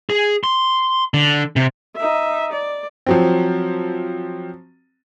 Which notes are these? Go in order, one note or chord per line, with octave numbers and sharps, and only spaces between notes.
G#4
C6
D3
C3
D#4 E5
D5
F3 F#3 C4